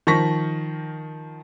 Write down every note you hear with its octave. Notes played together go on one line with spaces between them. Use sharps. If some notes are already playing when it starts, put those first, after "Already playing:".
D#3 F3 C#6 A#6 B6